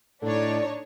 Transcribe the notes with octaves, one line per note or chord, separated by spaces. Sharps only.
A2 D3 D4 D#4 C#5 D5